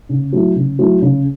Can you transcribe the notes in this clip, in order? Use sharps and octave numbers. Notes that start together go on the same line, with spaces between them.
C#3
F#3 A3 E4
C#3
F#3 A3 E4
C#3